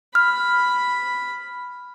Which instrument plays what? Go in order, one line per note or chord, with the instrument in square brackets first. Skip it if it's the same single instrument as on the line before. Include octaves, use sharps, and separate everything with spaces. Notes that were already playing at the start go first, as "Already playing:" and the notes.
[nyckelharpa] B5 [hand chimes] F6